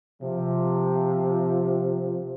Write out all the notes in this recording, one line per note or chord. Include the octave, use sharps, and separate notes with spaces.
C3 F3